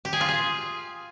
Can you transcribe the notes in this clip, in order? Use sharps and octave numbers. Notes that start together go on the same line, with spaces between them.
G4
G#4
F4
G#4